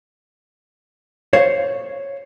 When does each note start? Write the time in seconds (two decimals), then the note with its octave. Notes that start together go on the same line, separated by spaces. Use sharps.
1.33 C5 C#5 F5